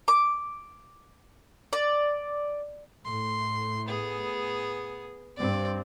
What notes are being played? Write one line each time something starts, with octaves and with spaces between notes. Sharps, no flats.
D6
D5
A2 C6
B3 G#4
G2 C4 D5